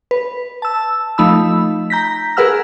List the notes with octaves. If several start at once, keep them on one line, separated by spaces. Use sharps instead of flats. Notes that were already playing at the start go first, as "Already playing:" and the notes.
B4
A5 E6
F3 A3 D#4 B5 E6
A#5 G6 A#6 B6
G#4 A#4 B4 F#5 E6 F6